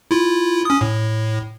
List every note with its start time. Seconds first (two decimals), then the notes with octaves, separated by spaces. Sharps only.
0.11 E4 F4
0.65 C#4 D#6
0.81 A2